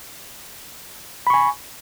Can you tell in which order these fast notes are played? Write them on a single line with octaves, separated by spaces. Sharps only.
B5 C#6 G#5